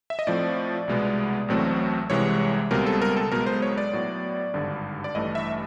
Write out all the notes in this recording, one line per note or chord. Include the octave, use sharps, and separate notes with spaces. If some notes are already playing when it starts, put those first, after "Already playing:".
E5
D#5
A2 F3 A3 C4 D5
C2 B2 G#3 B3
A1 A2 F#3 A3 C4
C2 C3 E3 G#3 C#5
C#2 B2 G3 C4 A#4
A4
A#4
A4
B1 B2 G#3 B3 A#4
C5
C#5
D5
A2 F#3 B3
G#1 G2 D3
D5
A1 G2 E3 A3 D#5
E5